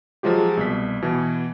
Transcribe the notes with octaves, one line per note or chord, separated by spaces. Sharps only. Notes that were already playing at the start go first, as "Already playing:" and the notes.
F3 F#3 G#3 F4 G4
C2 B2 B6
B2 E3